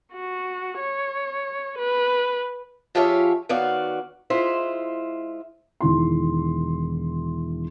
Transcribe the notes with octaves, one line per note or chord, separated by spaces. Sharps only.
F#4
C#5
B4
F3 F4 G4 G#4 C#5 E5
D#3 B3 F#4 C#5 D5 F5
G#3 E4 F4 C5 E5
E1 D#3 E4 C6